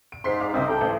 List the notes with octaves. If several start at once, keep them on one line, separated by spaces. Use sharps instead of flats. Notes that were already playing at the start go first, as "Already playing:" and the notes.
D7
G#2 C6 B6 C7
F5 D6
C2 C#3 C4 D#4
A4 G5 A#5
A1 A2 C5